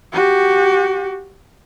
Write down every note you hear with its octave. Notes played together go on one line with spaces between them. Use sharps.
F#4 G4